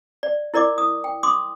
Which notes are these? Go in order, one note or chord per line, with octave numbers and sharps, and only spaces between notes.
D5
E4 A#4 D5 D#5 D6
D#6
G5
C6 D6 D#6